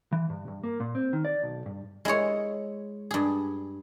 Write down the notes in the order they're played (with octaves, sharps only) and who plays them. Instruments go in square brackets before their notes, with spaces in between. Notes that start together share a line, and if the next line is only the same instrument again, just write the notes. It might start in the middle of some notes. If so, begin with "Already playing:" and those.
[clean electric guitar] E3
G2
G2
A#3
A#2
C4
D#3
D5
B1
G2
[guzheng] G#3 E4 G#4 C#5
G2 G#4